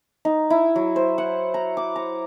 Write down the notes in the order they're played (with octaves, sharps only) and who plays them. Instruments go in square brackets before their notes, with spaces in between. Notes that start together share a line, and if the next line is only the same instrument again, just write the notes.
[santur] D#4
E4
F#3
C5
F#5
A#5
D6
A#5